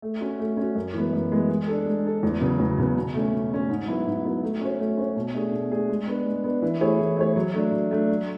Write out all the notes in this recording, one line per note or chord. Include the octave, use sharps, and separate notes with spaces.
A3
C#4 F#4
A3
C#4
F#4
F#2
E3 G#3 B3
F#2
E3 G#3 B3
G#3
D4 A4
G#3
D4 A4
E2
C#3 F#3 B3
E2
C#3 F#3 B3
B2
A3 C#4
B2
A3 C#4
G#2
F#3 B3 E4
G#2
F#3 B3 E4
A3
C#4 F#4 C#5
A3
C#4 F#4 C#5
B2
A3 D4 G#4
B2
A3 D4 G#4
G#3
B3 D4
G#3
B3 D4
E3
A3 E4 G#4 C#5
E3
A3 E4 G#4 C#5
F#3
A3 D4
F#3
A3 D4
F#3